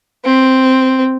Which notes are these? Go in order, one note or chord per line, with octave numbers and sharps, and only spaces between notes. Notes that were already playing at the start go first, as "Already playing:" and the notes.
C4